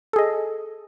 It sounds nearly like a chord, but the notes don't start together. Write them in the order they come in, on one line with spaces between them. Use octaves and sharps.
A4 G#4 D#5